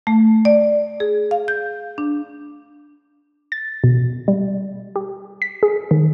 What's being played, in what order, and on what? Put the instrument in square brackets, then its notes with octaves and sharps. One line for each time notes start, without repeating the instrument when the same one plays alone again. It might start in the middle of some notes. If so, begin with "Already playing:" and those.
[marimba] A3
D5
G#4
F5
G6
D4
[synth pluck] A6
B2
G3
G4
B6
G#4
D#3